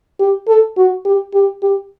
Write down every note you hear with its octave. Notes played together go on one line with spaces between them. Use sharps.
G4
A4
F#4
G4
G4
G4